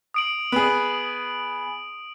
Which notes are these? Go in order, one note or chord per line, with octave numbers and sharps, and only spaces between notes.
D#6 D7 F#7
B3 G#4